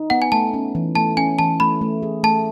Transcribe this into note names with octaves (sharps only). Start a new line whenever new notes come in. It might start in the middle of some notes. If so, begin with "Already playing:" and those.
Already playing: D#4
B3 F#5
G#5
A3 A5
C#4
E3
A3 A5
C#4 G#5
E3 A5
A3 B5
A3
G#4
A3 A5